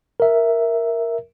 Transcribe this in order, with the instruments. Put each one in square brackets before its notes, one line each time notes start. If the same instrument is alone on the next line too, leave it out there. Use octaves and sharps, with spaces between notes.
[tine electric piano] A#4 E5